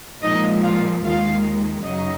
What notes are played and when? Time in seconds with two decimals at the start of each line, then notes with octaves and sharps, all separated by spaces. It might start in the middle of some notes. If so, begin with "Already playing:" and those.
0.22 A#2 F3 G#3 D#4 D#5
0.63 F4 F5
1.03 D#2 D#3 G#3 F4 F5
1.83 F#2 C#3 F#3 D#4 D#5